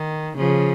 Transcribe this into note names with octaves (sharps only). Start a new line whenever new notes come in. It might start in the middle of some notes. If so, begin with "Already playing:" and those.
Already playing: D#3
C#3 F3